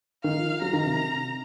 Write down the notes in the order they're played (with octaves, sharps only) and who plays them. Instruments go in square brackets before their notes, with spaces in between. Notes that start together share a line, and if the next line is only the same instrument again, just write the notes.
[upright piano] D#3 [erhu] F5
[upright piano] F3
[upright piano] F#3 [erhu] A#5
[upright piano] D#3
C3